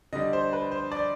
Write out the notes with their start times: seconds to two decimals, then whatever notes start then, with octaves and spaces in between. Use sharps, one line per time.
0.13 D3 G3 D#5
0.33 C5
0.53 B4
0.72 C5
0.92 D5